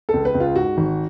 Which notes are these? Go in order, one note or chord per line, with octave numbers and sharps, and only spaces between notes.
C#2 A4
B4
C#2
F4
G#2 F#4
G#1